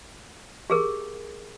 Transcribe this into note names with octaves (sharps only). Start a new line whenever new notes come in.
G4 G#4 A#4